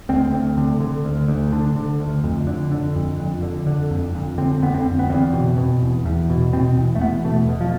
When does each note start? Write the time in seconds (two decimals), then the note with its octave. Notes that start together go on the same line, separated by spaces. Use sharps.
0.09 D2 C4
0.33 D2
0.57 D3
0.80 D3
1.05 D2
1.28 D2
1.52 D3 D4
1.76 D3
2.00 D2
2.24 F2
2.47 D3
2.71 D3
2.96 F2
3.20 F2
3.42 D3
3.66 D3
3.91 F2
4.15 F2
4.38 D3 C4
4.62 D3 B3
4.74 C4
4.86 F2
4.99 B3
5.10 E2 C4
5.33 B2
5.57 B2
5.82 E2
6.05 E2
6.30 B2
6.53 B2 C4
6.77 E2
6.95 A3
7.01 E2 B3
7.25 B2 A3
7.49 B2
7.61 F3